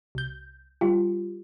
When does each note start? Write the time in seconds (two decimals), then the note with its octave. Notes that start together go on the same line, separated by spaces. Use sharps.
0.15 C2 G6
0.81 G3 F4 G4